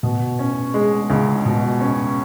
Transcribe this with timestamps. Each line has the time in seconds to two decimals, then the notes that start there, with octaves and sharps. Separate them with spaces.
0.03 B2
0.39 C#4
0.74 G#3
1.10 C#2
1.46 B2
1.80 C#4